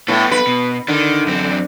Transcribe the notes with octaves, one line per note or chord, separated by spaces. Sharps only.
A2 B3 A4
B4
B2
D3 D#3
F#2 C4